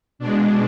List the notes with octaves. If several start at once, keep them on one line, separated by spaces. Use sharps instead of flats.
B2 G#3 D4